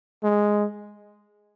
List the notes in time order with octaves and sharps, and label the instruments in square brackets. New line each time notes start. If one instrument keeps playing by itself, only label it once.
[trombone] G#3